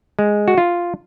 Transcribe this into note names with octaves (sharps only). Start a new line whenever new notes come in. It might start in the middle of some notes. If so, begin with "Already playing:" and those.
G#3
F#4
F4